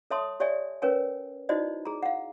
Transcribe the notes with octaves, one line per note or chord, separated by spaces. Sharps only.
A4 C#5 E5 A5 C6 D#6
G4 C#5 D5 E5 G#5
C#4 A#4 B4 C#5 G#5
D#4 E4 F#4 C5 D5 D#5
G#4 A#5
F5 F#5